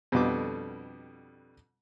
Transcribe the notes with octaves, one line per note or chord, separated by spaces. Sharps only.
F2 B2 D3 G3 B3 D6